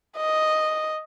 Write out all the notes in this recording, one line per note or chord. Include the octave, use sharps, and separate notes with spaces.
D#5